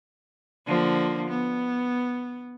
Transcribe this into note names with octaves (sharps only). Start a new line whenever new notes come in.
D3 F3 A#3
B3